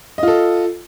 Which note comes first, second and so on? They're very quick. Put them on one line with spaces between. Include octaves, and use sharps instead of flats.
D#5 F4 A4